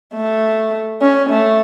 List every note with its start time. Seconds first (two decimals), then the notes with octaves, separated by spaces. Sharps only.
0.15 A3
1.02 C#4
1.30 A3